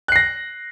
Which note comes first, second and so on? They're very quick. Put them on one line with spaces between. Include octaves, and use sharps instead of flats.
F#6 C7 A#6